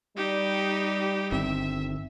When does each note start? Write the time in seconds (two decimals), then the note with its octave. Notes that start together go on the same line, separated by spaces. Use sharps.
0.17 G3 D#4 G4
1.32 G1 D#3 C4 E5